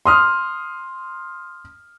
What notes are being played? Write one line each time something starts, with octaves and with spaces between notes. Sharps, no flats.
C6 D#6 F6